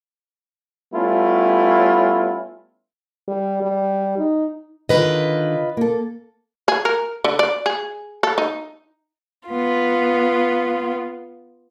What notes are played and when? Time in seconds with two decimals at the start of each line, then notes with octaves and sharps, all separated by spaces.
0.93 G3 A3 B3 C#4 E4 F4
3.28 G3
3.62 G3
4.18 D#4
4.89 D3 D#3 F4 B4 D#5
5.77 A#3 A4
6.68 G#4
6.85 A#4
7.24 D3
7.39 D5
7.66 G#4
8.23 A4
8.38 D#4
9.49 B3 F4